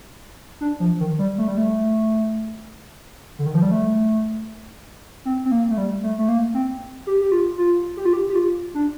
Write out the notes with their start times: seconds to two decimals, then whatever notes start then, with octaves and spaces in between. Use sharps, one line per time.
0.61 D4
0.80 F3
1.00 D#3
1.19 G3
1.38 A3
1.48 G3
1.57 A3
3.39 D3
3.46 D#3
3.55 F3
3.62 G3
3.71 A3
5.25 C4
5.45 C4
5.51 A#3
5.70 A3
5.78 G3
6.03 A3
6.18 A3
6.28 A#3
6.54 C4
7.07 G4
7.21 G4
7.32 F4
7.58 F4
7.97 G4
8.05 F4
8.13 G4
8.30 G4
8.36 F4
8.75 D4